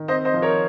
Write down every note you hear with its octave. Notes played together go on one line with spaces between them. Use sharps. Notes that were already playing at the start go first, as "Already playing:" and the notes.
Already playing: D#3
C4 C5 D#5
C5 D#5
F3
A#4 C#5